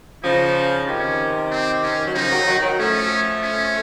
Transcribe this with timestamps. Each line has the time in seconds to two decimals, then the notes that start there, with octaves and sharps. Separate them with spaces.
0.23 C#3 F3 D#4
0.87 C3 D#3 C#4
1.50 C4
1.83 C#4
2.07 F#3
2.14 C#3 F3 D#4
2.30 D#3 F#3
2.46 D#3 F#3
2.62 D#3 F#3
2.78 F3 A3 C#4
3.43 C#4